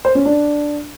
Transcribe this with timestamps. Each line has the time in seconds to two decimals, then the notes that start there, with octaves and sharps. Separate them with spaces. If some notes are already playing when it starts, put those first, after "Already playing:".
0.05 C5
0.15 C#4
0.25 D4